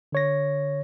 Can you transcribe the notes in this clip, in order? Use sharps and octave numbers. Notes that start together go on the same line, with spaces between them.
D3 C#5 A#6